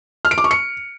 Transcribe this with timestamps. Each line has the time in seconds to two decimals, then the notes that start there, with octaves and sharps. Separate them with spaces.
0.25 F6
0.31 D7
0.38 D6
0.44 C#6
0.51 C#7